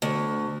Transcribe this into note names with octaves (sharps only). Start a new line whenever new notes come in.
D2